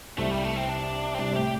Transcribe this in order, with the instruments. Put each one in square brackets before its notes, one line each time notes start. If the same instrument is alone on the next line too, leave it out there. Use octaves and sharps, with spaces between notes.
[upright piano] C2 C3 [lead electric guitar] A3
[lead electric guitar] G3
A3
C4
D4
C4
[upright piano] C2 C3 [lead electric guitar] D4
[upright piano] C3
[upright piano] A2 [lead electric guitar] G4